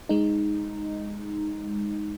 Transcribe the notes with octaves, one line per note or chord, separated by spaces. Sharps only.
G#3 D#4